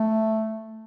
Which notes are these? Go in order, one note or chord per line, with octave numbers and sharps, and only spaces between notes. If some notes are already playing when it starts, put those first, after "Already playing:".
Already playing: A3